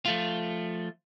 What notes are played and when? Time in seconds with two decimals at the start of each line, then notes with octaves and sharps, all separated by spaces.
0.06 F3 A3 F4